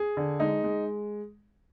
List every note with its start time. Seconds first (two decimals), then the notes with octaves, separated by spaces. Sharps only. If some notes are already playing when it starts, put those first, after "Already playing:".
Already playing: G#4
0.17 D3
0.40 G#3 D#4
0.64 G#3